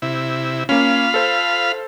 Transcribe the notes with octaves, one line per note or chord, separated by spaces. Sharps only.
C3 E4
A#3 C#4 F4 F5 B5
A4 C5